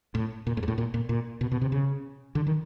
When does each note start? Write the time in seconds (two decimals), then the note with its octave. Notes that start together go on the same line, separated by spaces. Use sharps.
0.15 A2
0.47 A#2
0.57 A2
0.63 G#2
0.68 A2
0.78 A#2
0.94 A#2
1.09 A#2
1.41 B2
1.52 B2
1.62 C3
1.72 C#3
2.35 D3
2.47 D#3